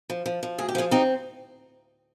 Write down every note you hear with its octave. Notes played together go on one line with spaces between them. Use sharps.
F3
F3
F3
D2 G#4
G4
F3 F4 G#4
C4 D#4 G4